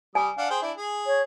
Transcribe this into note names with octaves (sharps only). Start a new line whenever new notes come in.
G3 G#5 D#6
D4 F5 F#5
G#4 C5 G5
D4 E4
G#4
C#5